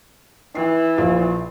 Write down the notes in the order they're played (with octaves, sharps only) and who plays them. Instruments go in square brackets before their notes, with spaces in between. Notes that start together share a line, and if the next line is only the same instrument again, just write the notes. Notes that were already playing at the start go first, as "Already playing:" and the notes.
[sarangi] E3 [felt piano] C7
[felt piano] A#1 F4 G#4